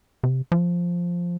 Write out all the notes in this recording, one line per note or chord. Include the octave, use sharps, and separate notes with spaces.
C3
F3